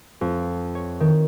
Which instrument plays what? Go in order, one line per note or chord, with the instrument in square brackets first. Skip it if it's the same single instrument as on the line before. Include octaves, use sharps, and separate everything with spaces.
[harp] F2
C#5
D#3